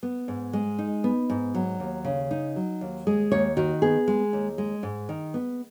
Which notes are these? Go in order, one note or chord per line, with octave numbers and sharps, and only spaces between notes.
B3
G#2
G#3
D#4
B3
G#2
F#3
D#2
C#3
D#4
F#3
D#2
G#3 G#4
D#2 C#5
D#3 F#4
B3 G#4
G#3
D#2
G#3
G#2
D#3
B3